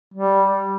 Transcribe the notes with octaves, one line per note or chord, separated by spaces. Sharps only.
G3